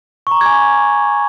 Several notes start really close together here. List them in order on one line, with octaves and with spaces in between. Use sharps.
C#6 A#5 D6 G#6 G#5